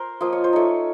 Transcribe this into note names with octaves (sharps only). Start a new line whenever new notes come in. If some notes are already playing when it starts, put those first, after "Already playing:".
Already playing: A#4 C5
F3 A#3 F4 D#5
C#5
C5
A3 D#4 C#5